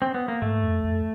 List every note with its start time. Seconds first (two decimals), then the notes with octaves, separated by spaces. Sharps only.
0.02 C4
0.14 B3
0.28 A#3
0.42 G#2 A3
0.64 F2
0.84 F2